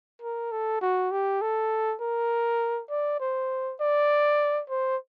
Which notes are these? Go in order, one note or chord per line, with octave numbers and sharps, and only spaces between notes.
A#4
A4
F#4
G4
A4
A#4
D5
C5
D5
C5